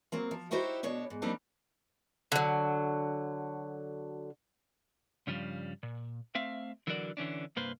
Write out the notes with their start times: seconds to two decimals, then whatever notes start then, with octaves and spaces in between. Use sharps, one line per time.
0.12 F#3 A#3 C4
0.31 F3
0.51 D#4 E4 F#4 G4 C5 C#5
0.83 D2 B2 D4 C#5
1.10 G#2
1.22 F#3 G3 A#3 C4 D4 D#4
2.32 D3 F#3
5.27 G2 C#3 F3 G3
5.83 A#2
6.35 A3 C4 E5 F5
6.87 D3 E3 F#3 F#4 A#4 D5
7.17 D3 E3 C#4 D4
7.56 C2 G2 A#3 B4 C5